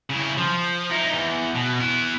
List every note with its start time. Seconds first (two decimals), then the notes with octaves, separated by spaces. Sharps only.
0.10 C#3 E4
0.37 F3
0.91 D#4 E4
1.13 E2
1.55 B2
1.80 B3 E4